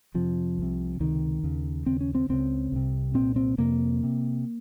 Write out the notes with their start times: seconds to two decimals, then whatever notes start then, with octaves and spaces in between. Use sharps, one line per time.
0.14 F2 C3 F3
0.58 C2 C3
1.00 C#2 C3 D#3
1.43 D#2 C#3
1.86 D#2 C#3 C4
2.01 C#4
2.15 C4
2.29 C#2 C#3 C4
2.72 C2 C3
3.14 C2 A#2 C4
3.36 C4
3.58 F2 C3 A#3
4.03 C3